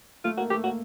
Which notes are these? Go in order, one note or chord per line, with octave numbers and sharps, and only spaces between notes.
A3 F4
A#3 F#4
A3 G4
A#3 F#4